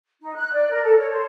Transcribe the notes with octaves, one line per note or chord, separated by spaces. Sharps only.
D#4
F#6
D5
A#4
A4
C#5
C5